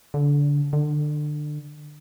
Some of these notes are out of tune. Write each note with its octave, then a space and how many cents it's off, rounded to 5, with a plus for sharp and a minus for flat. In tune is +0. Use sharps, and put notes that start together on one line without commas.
D3 -25
D3 +25